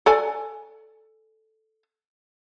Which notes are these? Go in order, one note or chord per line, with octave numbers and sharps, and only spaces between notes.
A4 D5 G#5